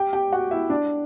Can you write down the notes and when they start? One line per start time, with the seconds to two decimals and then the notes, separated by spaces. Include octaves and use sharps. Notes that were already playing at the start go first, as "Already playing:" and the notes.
Already playing: G4 G5
0.13 G4 G5
0.32 F#4 F#5
0.51 E4 E5
0.70 D4 D5